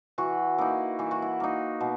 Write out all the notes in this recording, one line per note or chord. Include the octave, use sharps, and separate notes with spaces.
E3 F#4
A#3 D#4 E4
E3 E4
F#4
E4
A#3 D#4
B2